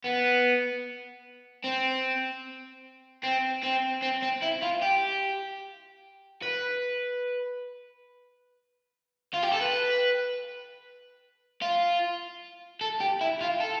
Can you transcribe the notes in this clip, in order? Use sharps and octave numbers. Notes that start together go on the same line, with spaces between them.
B3
C4
C4
C4
C4
C4
E4
F4
G4
B4
F4
G4
A4
B4
F4
A4
G4
E4
F4
A4